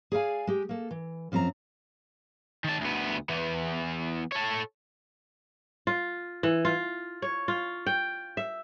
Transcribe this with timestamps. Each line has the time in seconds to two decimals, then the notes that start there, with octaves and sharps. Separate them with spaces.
0.12 G#4 D5 F5 G#5
0.47 G#3 G4
0.69 A#3 A4
0.91 E3
1.32 F#2 F3 C4 G4 A#5
2.64 D#3 A5
2.81 D2 B3
3.29 E3 B3
4.32 A4 C#5
5.87 F4
6.43 E3
6.65 F4
7.22 C#5
7.48 F4
7.86 G5
8.37 E5